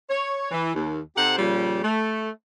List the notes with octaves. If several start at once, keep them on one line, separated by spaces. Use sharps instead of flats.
C#5
E3
D#2
C3 D#4 G4 A4 C5 F#5
A#2 C#3 F3 G3
A3